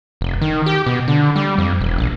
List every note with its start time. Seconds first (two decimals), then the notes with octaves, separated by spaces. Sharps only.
0.21 F1
0.41 D#3
0.66 G4
0.86 B2
1.08 D3
1.36 G3
1.58 F2
1.81 E1
1.98 A#1